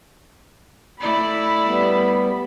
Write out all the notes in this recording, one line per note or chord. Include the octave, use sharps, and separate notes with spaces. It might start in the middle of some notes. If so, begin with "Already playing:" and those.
A3 E4 D5 B5
G3 B3